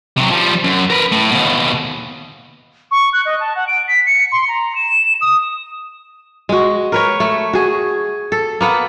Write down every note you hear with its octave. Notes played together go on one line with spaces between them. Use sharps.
C3 F#3
F3 G3
F#2
A#4 B4
A2
D#2 B2
C#6
F#6
D#5
A5
F#5
D7
B6
C#7
C6
A#5
E7
D#6
G#3 F#4
A#4 B4 C#5
A3
F#4 G#4
A4
A#3 B3 F#5